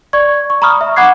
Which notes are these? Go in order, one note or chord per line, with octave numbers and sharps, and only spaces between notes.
D5 C#6 G#6
C#6
A#5 B5 C#6 D#6 F6
E5
F#5 B5 D6 F#6 G#6 C7